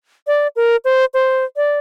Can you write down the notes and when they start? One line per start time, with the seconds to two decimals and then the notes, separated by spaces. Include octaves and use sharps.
0.27 D5
0.56 A#4
0.85 C5
1.14 C5
1.56 D5